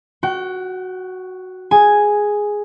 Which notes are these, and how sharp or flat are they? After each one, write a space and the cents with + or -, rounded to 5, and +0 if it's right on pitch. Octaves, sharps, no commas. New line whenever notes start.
F#4 +0 G5 -40
G#4 +0 G#5 +0